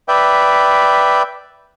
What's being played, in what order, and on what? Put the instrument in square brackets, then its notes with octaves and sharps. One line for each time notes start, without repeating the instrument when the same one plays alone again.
[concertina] B4 D5 E5 G5